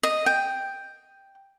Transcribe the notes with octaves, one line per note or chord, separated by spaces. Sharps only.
D#5
G5